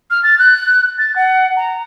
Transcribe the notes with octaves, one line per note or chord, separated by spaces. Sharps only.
F6
A6
F#6
A6
F#5
A#5